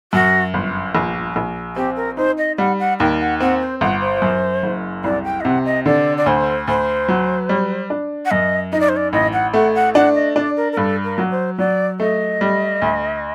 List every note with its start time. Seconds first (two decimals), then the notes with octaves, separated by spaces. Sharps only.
0.13 F#2 F#4
0.54 G1
0.95 A#1
1.36 A#1
1.76 C4 G4
1.96 A#4
2.17 D#4 C5
2.38 D#5
2.58 G3 F#5
2.79 F#5
2.99 D#2 G5
3.20 F#5
3.41 C4 F#5
3.61 C5
3.81 G1 F#5
4.01 C5
4.22 F#2
4.63 F#1
5.04 C2 D5
5.25 G5
5.41 D#5
5.44 C3 F#5
5.65 D#5
5.86 D3 D5
6.17 D5
6.26 D2 C5
6.68 D2 C5
7.09 F#3
7.49 G3
7.90 D4
8.25 F#5
8.31 F#2 D#5
8.72 D#4 D#5
8.80 D5
8.89 C5
8.96 D5
9.13 A1 D#5
9.33 F#5
9.54 A3 F#5
9.75 F#5
9.95 D4 F#5
10.15 D#5
10.36 D4 D5
10.57 A#4
10.72 A#4
10.77 G2 A4
11.04 A#4
11.18 F#3
11.31 C5
11.58 F#3 D5
12.00 A3 D#5
12.41 G3
12.82 D2